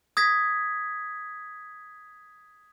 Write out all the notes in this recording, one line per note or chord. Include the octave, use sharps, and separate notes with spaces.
D#6 G#6 A#6 B6